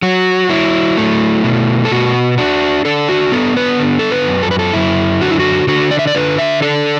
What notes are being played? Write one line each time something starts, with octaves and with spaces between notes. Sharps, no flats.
F#3 F#4
F#3 E4
A3
B2
A4
B2 F#4
D4 F#4
D4 A4
F#4
B3 A4
B4
D3
A4
B4
F#2
A4
B4
A4
F#2 E4
D3 F#4
E4
F#4
D3 F#4
D5
E5
D5
D3 B4
E5
D4 A4